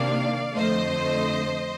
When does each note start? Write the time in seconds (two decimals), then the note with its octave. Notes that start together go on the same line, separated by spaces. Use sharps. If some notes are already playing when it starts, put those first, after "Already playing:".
Already playing: C3 D#3 A#3 D4 D5 F5
0.55 F2 D3 F3 A3 C5 D#5